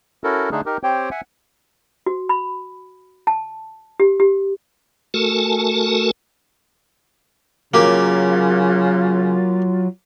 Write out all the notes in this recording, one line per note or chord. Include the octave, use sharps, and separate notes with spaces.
C#4 E4 F#4 A4 A#4
D3 A3 D4 D#4 G#4
D#4 G4 A#4
C4 G4 C5 C#5 G5
E5 F#5 G#5
F#4
B5
A5
G4
G4
A3 F#4 A4 A#4 G#5 A5
C#3 F#3 A#3 F4 G4